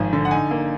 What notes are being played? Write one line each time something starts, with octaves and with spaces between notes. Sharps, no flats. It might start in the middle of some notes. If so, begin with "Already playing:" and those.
Already playing: G#1 F3 G#5
D3
F#5
D#4 G#5
A#3